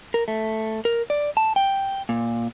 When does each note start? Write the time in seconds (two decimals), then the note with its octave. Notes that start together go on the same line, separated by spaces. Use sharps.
0.14 A#4
0.28 A3
0.85 A#4
1.10 D5
1.37 A5
1.56 G5
2.09 A#2